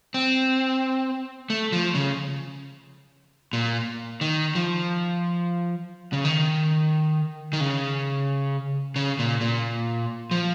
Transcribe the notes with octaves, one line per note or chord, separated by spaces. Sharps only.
C4
A3
F3
C#3
A#2
D#3
F3
C#3
D#3
D#3
C#3
C#3
A#2
A#2
F3